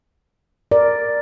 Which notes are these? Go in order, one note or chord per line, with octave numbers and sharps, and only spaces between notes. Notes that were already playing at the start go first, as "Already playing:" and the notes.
A#4 D5